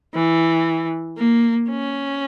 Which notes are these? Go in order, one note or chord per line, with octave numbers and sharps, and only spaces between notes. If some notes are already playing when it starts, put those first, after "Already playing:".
E3
A#3
C#4